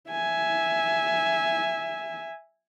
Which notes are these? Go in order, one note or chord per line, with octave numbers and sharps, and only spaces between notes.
E5 G#5